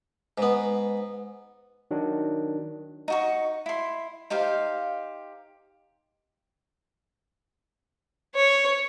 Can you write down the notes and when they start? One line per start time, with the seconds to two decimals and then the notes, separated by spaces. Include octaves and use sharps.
0.38 G#2 B3
1.91 D#3 F#3 D4
3.08 D#4 F#4 C#6
3.66 E4 C6
4.30 D#4 G4 C5 F5
8.35 C#5